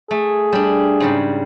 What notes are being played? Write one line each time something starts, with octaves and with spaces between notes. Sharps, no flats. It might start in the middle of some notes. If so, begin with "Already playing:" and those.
A3 G#4
G3 D4
G#2 C#3 G3